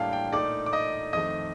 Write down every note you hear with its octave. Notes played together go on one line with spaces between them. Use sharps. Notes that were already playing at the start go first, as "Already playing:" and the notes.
Already playing: A2 G3 A#3 D4 F5 G5 A5
G5
A#2 A3 D#4 D5 D6
D6
D#5 D#6
F2 D#3 A3 D#5 D#6